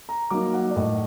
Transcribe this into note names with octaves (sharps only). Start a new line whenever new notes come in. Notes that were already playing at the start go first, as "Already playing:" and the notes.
A#5
F#3 A#3 D#4 D6
F#5
D5
A2 D#5